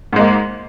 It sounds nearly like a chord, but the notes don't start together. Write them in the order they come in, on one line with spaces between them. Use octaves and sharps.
G#2 G#3 A#3